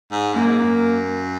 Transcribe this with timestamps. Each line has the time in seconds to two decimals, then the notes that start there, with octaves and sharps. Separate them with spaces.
0.11 G#2
0.34 F#2 A#3
0.46 G#2
0.59 F#2